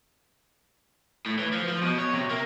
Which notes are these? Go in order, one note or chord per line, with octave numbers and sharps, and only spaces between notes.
A2
E3
F3
F3
B2
C#5
C3
A#3